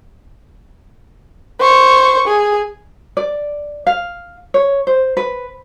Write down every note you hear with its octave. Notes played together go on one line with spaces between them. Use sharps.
C5 C#6
G#4
D5
F5
C#5
C5
B4